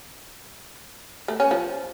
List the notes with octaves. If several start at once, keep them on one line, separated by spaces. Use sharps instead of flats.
A3
C#4
F3